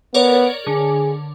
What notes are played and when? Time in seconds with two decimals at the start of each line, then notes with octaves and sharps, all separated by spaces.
0.14 B3 A#4 C#5 D5
0.67 D3 G#4